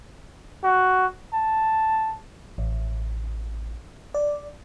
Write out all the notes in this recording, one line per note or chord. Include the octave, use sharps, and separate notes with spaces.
F#4
A5
A1
D5